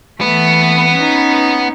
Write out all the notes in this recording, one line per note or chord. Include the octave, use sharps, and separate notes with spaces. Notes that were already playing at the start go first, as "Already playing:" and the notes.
E3 A3 B3 B4
C#4 D#4